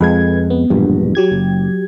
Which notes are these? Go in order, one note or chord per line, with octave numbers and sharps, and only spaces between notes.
F2 G#3 B4 G#6
B3
E1 A#1 G2
F#3 G4 G#6
F#1